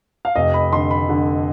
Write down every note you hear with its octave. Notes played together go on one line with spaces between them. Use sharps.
F5
F1 D#5
B5
D3 C6
B5
D3